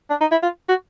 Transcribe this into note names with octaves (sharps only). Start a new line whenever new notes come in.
D4
D#4
E4
F4
F#4